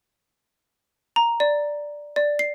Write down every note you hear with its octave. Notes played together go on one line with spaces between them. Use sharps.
A#5
D5
D5
C7